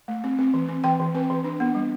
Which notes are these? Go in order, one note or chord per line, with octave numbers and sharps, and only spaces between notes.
A3
C4
C4
E3
C4
E3 G5
E3
C4 B4
E3
D4
B3
G3